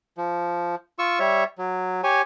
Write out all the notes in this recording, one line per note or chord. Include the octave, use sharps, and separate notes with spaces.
F3
F4 C#6 E6
G3 C#5 E5
F#3
G4 C#5 G#5